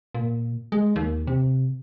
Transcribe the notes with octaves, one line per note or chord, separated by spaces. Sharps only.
A#2
G#3
D#2
C3